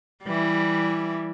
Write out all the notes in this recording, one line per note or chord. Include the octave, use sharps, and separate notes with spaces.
E3 G3